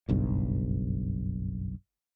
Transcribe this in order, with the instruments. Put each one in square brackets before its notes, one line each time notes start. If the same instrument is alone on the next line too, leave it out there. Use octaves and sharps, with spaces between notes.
[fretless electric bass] F#1 B1 G2